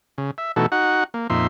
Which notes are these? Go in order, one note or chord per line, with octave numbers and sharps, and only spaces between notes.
C#3
E5
B2 E3 A3 D#4 F#4 A4
D#4 F#4 F#5
A#3
F2 A#2 D#4 E5 C6